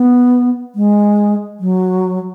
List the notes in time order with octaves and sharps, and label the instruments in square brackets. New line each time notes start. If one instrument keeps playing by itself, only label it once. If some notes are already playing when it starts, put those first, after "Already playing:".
Already playing: [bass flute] B3
G#3
F#3